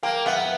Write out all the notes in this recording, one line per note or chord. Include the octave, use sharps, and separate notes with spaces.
A#3 F5 G5
B3 E5 F#5